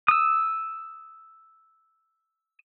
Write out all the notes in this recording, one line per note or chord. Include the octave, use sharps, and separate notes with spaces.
D#6 E6